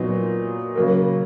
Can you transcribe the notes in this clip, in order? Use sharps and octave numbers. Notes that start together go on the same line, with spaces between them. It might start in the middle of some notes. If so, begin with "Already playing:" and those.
Already playing: A#2 F#3 B3 D#4
C#3 F#3 A#3